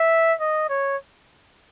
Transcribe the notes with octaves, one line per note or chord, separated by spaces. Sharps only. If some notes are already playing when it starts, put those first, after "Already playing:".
Already playing: E5
D#5
C#5